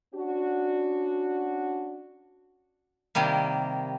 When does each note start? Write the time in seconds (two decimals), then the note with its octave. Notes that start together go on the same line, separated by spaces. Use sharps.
0.14 C#4 D4 F#4
3.15 C3 D#3 G3 A#3